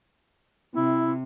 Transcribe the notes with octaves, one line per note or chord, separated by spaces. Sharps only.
C3 E4